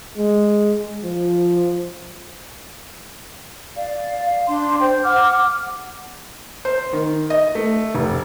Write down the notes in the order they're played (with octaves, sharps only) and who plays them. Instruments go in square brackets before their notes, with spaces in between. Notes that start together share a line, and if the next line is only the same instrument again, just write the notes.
[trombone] G#3
F3
[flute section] D5 F5
F5
D4 C6
C5 G5
F#5 D6 F6
[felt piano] C5
D#3
D#5
A3
F1